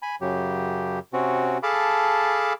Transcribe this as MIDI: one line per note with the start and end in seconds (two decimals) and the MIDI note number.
0.02 0.15 80
0.02 0.15 83
0.21 0.99 42
0.21 0.99 49
0.21 0.99 54
0.21 0.99 67
1.13 1.58 48
1.13 1.58 60
1.13 1.58 61
1.13 1.58 66
1.63 2.53 68
1.63 2.53 69
1.63 2.53 77
1.63 2.53 81
1.63 2.53 83
1.63 2.53 86